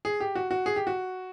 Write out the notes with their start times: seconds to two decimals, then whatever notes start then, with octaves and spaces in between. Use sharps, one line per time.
0.05 G#4
0.20 G4
0.35 F#4
0.51 F#4
0.66 G#4
0.76 G4
0.87 F#4